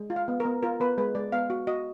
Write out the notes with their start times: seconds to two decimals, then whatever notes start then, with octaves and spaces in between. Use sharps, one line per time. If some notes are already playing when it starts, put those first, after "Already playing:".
Already playing: G#3
0.10 F4
0.16 F5
0.28 B3
0.40 A#4
0.45 B3
0.63 F4 A#4
0.80 B3 B4
0.98 G#3 B4
1.15 G#3 D5
1.32 B3 F5
1.50 F#4
1.67 F#4 D#5